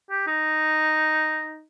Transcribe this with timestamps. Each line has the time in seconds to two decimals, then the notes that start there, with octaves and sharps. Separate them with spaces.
0.11 G4
0.27 D#4